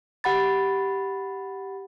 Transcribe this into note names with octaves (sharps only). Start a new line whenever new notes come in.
G4 F#5 B5 A6